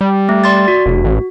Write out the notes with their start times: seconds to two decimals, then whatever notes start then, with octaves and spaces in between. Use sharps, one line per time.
0.01 G3
0.29 A3
0.44 D5 C6 A6
0.68 F#4
0.86 F1
1.04 A1